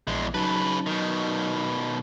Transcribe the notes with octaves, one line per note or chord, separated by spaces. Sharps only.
A#1 E2 G#3
C#3 F#3 D#4 B4 A5
B2 D#3